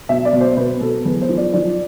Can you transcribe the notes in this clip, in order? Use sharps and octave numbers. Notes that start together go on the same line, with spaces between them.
B2 E5
D5
B2
C5
B2 B4
B2 A4
E2 B4
C5
F3
D5
F3 D5